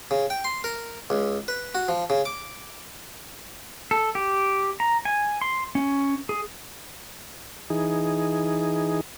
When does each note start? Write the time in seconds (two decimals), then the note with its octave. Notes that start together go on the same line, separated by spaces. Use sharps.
0.11 C#3
0.30 G5
0.44 C6
0.64 A#4
1.10 C#2
1.48 B4
1.75 F#4
1.88 F3
2.10 C#3
2.25 D6
3.91 A4
4.15 G4
4.80 A#5
5.05 G#5
5.41 C6
5.75 C#4
6.29 G#4
7.70 E3 D#4 G#4